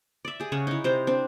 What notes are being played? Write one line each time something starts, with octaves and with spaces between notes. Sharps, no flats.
D5 E5
G4 G#4
C#3 C#5 F#5
D#4 E4
C3 C5 A#5
C4 D4